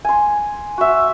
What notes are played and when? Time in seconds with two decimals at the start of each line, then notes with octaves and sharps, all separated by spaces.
0.05 G#5 C6
0.78 F#4 E5